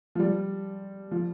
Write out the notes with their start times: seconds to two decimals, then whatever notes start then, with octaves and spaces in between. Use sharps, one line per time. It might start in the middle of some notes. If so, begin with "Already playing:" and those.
0.15 F3
0.19 G3
1.11 F3